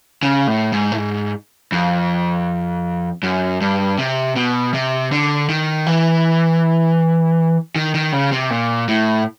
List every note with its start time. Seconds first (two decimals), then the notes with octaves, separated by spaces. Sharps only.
0.23 C#3
0.47 A2
0.72 G#2
0.92 A2
0.97 G#2
1.72 F2
3.23 F#2
3.61 G2
3.99 C3
4.36 B2
4.74 C3
5.12 D3
5.49 D#3
5.86 E3
7.76 D#3
7.94 D#3
8.13 C#3
8.32 C3
8.50 A#2
8.88 A2